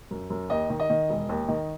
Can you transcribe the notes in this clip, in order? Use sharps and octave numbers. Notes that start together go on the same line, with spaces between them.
F#2
F#2
D#2 D#5
D#3
D#5
D#3
E1
D#2
D#3